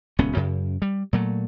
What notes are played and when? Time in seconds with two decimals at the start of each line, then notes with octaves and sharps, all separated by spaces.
0.19 D#1 C#2 B3 C#4
0.36 F#2 C#3
0.82 G3
1.13 A#2 F#3 A3